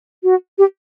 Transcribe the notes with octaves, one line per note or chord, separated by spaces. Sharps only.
F#4
G4